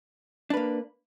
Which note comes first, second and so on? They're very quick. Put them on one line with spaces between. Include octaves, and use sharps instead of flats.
D4 B4 A#3